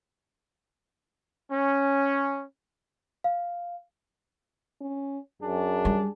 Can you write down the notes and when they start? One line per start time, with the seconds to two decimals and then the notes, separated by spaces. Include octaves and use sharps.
1.52 C#4
3.24 F5
4.81 C#4
5.42 F#2 D4 G#4
5.85 G3